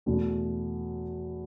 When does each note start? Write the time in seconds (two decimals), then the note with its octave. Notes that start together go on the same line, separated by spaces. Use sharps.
0.06 E2 B2 A3